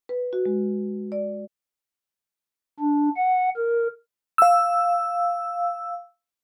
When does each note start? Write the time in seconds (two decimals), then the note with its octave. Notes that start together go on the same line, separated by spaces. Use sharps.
0.09 B4
0.33 F#4
0.46 G#3
1.12 D5
2.80 D4
3.16 F#5
3.56 A#4
4.38 F5 E6